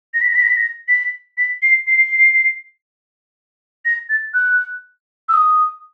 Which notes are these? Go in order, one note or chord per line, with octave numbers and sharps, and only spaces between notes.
A#6
B6
A#6
B6
A#6
B6
A#6
B6
B6
C7
C7
A#6
A6
F#6
E6
D#6